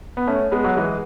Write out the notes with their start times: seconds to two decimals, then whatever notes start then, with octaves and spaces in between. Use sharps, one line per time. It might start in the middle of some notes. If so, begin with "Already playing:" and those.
0.17 B3
0.27 A3 C#4
0.51 G#3 B3
0.64 F#3
0.76 E3 G#3